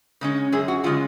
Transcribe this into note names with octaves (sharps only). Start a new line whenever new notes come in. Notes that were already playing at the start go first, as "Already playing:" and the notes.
C#3 G#3 C#4
F#2 G#4
F#4
C#3 G#3 C#4 F4